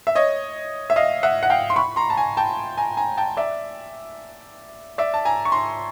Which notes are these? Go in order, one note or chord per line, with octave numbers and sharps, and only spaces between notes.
E5
C#5 D#5
E5
D#5 F5
E5 F#5
F#5
F5 G5
C6
B5 C#6
A#5 C6
A5
G#5 A#5
G5 A5
G#5 A#5
G#5 A#5
G5 A5
D5 E5
D5 E5
A5
G#5 A#5
C#6
A#5 C6